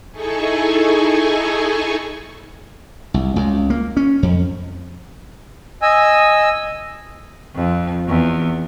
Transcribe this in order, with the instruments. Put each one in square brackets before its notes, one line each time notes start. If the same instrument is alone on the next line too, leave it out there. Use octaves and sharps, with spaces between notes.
[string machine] D#4 E4 G#4 A4 G#5 C#6
[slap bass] C2
C#2
A#3
C#4
F2
[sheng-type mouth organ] D#5 G#5 E6
[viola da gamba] F2
E2